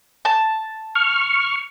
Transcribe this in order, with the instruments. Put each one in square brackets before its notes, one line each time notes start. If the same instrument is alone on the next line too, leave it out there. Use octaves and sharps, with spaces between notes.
[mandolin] A5
[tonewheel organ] C#6 F6